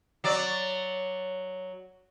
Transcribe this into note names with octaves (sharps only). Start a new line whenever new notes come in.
F#3 D5